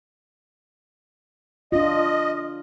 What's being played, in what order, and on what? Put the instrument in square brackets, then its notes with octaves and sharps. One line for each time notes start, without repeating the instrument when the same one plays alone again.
[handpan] D4 F4 [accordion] D#5